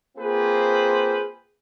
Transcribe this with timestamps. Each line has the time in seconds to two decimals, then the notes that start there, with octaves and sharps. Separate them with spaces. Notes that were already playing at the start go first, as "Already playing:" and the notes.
0.18 A#3 C4 F4 G#4 B4 C5